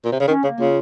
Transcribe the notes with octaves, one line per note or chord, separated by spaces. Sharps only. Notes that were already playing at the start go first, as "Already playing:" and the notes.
A#2
C3
C#3
D#3 C#4
C#3 A#3
C#3 F4